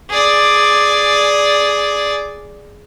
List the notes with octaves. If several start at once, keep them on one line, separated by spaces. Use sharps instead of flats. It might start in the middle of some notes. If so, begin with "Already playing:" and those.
G#4 D5